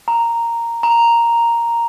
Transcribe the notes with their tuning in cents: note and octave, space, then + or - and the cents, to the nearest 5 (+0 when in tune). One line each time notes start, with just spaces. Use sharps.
A#5 -5
A#5 +0